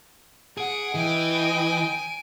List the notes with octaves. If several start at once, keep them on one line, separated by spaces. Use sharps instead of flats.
G#4 F#5 D7
E3 D#5 G5 G#5 D7